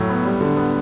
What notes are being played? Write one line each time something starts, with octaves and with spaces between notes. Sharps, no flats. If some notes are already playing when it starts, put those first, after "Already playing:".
Already playing: A2 F#3
B3
G3
D3
B3